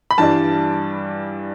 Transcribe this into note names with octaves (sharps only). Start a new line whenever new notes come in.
B5
G2 E3 G3 D4 A5